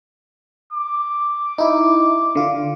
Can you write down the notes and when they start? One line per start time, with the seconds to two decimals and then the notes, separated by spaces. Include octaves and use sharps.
0.73 D6
1.58 D#4 E4
2.35 D3 F4